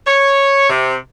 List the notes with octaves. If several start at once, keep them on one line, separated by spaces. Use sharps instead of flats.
C#5
C3